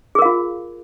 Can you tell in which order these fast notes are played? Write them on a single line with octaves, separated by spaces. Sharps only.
G#4 A#4 F5 F4